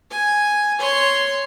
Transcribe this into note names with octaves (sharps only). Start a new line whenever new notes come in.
G#5
C#5 C6